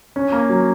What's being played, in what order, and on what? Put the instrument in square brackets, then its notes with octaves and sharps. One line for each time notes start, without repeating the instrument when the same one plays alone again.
[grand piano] C#4
A#3
F#3